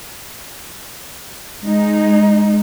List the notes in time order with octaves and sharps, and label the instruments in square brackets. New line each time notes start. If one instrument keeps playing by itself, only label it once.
[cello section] G#3 D#4